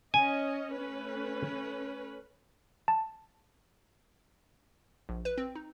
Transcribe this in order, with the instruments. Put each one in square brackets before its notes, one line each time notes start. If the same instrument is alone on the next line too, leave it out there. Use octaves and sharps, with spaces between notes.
[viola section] C#4 D#5 [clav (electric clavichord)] G#5
[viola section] A3 C#4 B4
[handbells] A5
[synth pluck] A#1
B4
C4
D#4